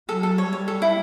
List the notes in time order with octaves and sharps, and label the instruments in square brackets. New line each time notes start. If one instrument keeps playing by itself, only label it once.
[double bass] F#3 [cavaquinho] A4
[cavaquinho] A4
[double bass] G3 [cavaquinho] C#5
[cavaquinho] C#5
A4
E4